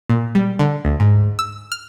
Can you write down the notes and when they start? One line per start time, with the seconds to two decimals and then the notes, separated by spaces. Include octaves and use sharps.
0.09 A#2
0.35 G3
0.59 D3
0.85 D2
1.00 G#2
1.39 E6
1.72 F6